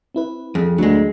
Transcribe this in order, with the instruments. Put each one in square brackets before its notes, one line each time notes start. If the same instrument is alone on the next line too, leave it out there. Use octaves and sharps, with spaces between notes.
[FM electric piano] C4 E4 B4
[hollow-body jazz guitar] F2 [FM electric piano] G#4
[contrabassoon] D2 [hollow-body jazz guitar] F#3 G#3